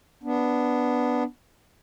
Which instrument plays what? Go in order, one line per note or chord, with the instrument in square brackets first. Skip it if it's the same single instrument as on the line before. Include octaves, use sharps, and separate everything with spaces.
[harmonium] B3 D4